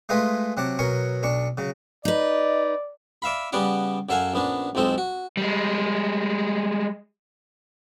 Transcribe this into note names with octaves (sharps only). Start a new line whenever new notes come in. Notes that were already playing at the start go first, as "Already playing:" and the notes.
G#3 A3 F4 B4 D#5 G#5
C3 F#3 F#5 A5 D6
B2 F#3 A#4 G#5 C#6
B1 D4 C#6
C#3 F#3
D#4 B4 D5 D#5
D5 E5 F5 B5
C#3 G3 B3 C#4 D5 F#5
F#2 F#3 A4 F5 F#5 G#5
A#1 B3 C#4 D4
B1 F2 G#3 C4 A4
F#4
G3 G#3